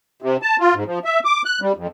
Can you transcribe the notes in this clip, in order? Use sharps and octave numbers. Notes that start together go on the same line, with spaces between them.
C3
A5
F4
G#2
F3
E5
D6
F#6
G3
F2